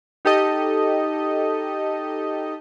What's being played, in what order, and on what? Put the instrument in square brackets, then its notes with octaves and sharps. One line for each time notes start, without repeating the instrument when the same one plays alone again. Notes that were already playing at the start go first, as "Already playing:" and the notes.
[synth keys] D#4 G4 A4 D#5